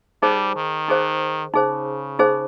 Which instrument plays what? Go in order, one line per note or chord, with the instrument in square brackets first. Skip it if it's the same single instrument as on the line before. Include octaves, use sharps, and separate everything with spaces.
[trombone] G3 [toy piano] D#4 G#4 C5
[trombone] D#3
[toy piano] D#4 G#4 C5
[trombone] C#3 [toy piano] D#4 G#4 C5
[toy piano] D#4 G#4 C5